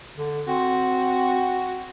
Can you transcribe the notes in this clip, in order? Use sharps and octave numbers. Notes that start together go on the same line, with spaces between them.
D3
C4 F#4